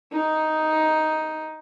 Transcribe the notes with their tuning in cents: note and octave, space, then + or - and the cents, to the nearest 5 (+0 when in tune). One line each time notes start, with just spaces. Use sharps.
D#4 +5